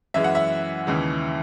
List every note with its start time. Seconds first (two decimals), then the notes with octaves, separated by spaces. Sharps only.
0.14 F#2 E3 G#3 E5
0.24 F#5
0.35 E5
0.87 D#2 C#3 E3 G#3